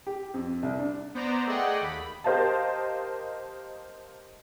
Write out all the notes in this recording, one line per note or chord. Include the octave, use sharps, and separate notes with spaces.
G4
F2
C2
D4
B3 C5 D5 A#5
A3 G#4 D5 D#5 F#5 G5
D#2 B5
G4 A#4 C5 D#5 F5 A5